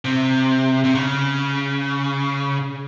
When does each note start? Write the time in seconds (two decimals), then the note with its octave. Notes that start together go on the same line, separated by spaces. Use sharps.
0.05 C3
0.85 C3
0.95 C#3